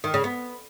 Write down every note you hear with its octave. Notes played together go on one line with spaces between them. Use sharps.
D#3
C#3
B3